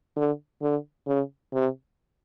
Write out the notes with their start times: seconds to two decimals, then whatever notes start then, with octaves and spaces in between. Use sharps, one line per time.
0.16 D3
0.62 D3
1.07 C#3
1.53 C3